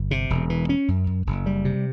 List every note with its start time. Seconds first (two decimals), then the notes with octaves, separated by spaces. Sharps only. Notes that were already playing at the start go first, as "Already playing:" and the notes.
Already playing: G1
0.11 C3
0.30 E1
0.50 E3
0.69 C#4
0.88 F#2
1.07 F#2
1.26 F#1
1.46 G3
1.65 C3